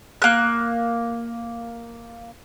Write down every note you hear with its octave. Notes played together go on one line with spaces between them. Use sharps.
A#3 F#6